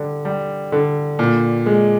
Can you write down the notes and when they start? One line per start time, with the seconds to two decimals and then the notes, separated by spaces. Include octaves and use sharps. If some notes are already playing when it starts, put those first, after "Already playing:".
Already playing: D3 G3
0.25 G3
0.72 D3
1.19 A#2
1.66 G#3